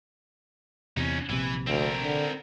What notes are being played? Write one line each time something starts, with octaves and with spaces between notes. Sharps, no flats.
E2 C3 C#4 D#4
A#1 C3 E3
D2 C4 A#4
D3